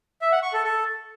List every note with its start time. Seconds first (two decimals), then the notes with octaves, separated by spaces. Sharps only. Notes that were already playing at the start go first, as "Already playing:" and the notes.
0.22 E5
0.32 F#5
0.43 C#6
0.53 A4
0.64 A4